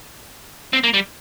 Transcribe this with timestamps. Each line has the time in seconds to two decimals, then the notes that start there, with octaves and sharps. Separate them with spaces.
0.73 C4
0.84 A#3
0.94 G3